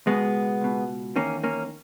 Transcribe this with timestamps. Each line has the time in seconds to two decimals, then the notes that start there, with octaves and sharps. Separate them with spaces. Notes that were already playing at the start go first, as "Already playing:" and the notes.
0.06 C#2 B2 G#3 B3
0.61 C#2 B2
1.16 E2 D#3 A#3 C#4
1.44 A#3 C#4